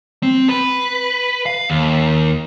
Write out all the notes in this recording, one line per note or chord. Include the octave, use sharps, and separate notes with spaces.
C4
B4
F5
D#2